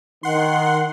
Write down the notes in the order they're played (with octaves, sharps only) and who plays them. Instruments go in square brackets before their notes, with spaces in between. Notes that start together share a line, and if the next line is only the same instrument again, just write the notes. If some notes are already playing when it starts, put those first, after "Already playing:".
[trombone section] D#3 [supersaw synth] F#5 C6